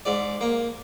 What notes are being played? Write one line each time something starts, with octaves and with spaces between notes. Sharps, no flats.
G#2 D5
A#3